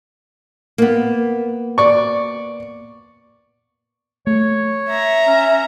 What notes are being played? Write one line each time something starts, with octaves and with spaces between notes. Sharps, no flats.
A#3 B3
D5 C#6
A3 C#5
E5 A#5
C#4